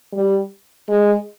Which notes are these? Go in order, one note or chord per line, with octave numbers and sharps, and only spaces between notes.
G3
G#3